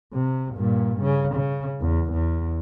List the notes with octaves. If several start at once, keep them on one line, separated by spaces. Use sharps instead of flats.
C3
G2 A#2
C#3
C#3
E2
E2